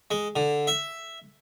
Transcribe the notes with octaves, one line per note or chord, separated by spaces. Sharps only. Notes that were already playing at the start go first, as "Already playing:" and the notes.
G#3
D3
E5